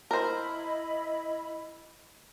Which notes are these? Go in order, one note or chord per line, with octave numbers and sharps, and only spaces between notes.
E4 A#4 C5 D#5 B5